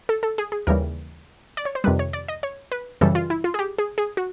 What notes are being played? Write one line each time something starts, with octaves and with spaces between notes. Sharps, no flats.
A4
A4
G#4
G#4
D#2 C#3 E3 G3 A#4
D5
C#5
C5
F2 C3 D#3 G3 B4
C#5
D5
D#5
C#5
B4
F#2 C#3 E3 G3 A4
F4
E4
F4
G#4
G4
G#4
G#4
F#4